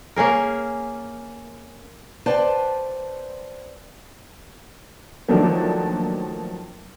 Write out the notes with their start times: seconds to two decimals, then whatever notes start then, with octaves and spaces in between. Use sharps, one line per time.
0.16 A#3 C#4 G#4 A#4
2.26 B4 C5 D5 G5 A5
5.28 D#3 F3 F#3 A3 A#3 D4